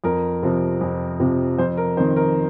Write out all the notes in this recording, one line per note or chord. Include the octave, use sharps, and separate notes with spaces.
F2 A#4
C3 F3 C4
F2
C3 F3 C4
F2 C5
A#4
D#3 C4 D#4 C5
A#4